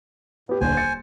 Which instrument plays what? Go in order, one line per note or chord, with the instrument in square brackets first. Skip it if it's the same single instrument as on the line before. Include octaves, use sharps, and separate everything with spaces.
[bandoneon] A2 [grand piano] B3 G4
[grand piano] D#1 D3 [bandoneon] C5 G#5
[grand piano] A6 C#7